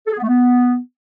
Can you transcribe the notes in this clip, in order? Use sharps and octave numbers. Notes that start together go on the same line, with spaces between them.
A4
G#4
B3
A3
B3